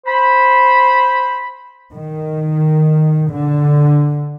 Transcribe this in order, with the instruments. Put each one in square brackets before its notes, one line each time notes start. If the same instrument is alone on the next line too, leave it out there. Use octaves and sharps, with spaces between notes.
[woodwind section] C5 B5
[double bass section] D#3
D3